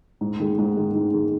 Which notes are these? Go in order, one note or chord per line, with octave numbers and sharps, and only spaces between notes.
G#2
D#3 G#3
G#2
D#3 G#3
G#2
D#3 G#3